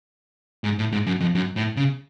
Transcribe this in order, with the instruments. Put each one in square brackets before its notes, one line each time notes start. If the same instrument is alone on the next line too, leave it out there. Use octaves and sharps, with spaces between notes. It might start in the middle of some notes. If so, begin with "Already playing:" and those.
[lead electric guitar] G#2
A2
G#2
F#2
F2
F#2
A2
C#3